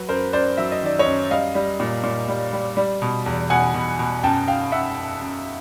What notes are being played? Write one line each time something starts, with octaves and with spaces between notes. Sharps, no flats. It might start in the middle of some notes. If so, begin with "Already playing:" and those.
Already playing: F#3 B4
F#2 A#4 C5
F#2 C5 D5
F#3 E5
D#5
D#3 D5
C#5 D#5
F#2
G3 D#5 F5
G3
A#2
A#2
G3
G3
G3
B2
E2
B2 F#5 G#5
B2
B2
F#2 G5 A5
F#2 F5 G5
F#2 E5 F#5
F#2
F#2